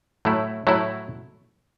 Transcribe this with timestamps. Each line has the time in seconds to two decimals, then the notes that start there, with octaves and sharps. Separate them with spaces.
0.25 A2 F#3 A3 E4
0.67 A2 F#3 A3 E4